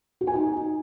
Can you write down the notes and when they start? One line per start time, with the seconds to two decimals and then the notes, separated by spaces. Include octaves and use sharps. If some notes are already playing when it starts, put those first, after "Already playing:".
0.21 F#4
0.27 G#5
0.34 D#4